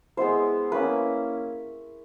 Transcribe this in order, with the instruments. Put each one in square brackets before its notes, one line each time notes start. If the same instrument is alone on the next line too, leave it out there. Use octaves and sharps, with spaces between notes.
[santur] G#3 B3 E4 C5
A#3 C#4 E4 B4